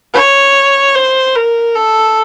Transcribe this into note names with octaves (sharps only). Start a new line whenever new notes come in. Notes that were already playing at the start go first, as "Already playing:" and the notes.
C#5
C5
A#4
A4